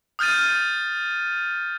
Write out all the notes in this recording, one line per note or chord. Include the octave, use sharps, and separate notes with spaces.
D#6 F6 G6 A6 D#7